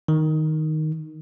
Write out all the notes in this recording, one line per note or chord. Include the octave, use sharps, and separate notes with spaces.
D#3